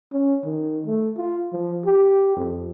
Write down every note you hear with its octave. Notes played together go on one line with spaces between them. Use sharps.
C#4
D#3
A3
F4
F3
G4
F2